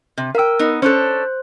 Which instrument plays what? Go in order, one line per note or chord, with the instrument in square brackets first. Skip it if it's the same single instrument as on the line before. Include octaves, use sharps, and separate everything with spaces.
[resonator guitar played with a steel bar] C3
[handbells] A#4 E6 [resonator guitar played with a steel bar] F5 G5
[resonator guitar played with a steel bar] B3 D#4
[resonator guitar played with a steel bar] C#4 D4 A4 [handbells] C5 F#6